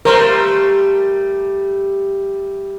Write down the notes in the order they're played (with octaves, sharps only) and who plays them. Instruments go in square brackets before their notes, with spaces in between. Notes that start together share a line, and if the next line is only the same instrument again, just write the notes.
[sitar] G3 A3 [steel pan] A#4 C5 C6